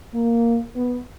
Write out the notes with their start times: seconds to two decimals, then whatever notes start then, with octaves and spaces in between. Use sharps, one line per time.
0.14 A#3
0.76 B3